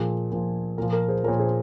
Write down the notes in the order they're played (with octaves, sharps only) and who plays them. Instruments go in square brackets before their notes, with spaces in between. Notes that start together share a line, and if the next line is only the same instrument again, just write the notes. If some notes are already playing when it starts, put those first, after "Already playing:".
Already playing: [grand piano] A#2 F3 G#4
A#2 F3
A#2 A#4
F3
A#4
G#4 C5
F3 A#4 C#5
A#2
G#4 C5